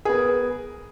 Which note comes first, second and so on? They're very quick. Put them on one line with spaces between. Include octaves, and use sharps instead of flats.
G#4 B3 A#4